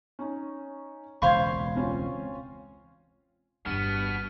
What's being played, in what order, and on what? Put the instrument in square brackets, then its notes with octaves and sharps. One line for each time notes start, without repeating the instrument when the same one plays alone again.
[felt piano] C#4 D#4
[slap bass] E1 C#2 [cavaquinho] C5 F5 C#6 [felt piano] B5 G#6
[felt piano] C4 C#4 F4
[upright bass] G1 E2 [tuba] G2 [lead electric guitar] B2 B3 [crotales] F6 D#7